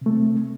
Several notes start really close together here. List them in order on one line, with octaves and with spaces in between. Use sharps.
C3 A3 C4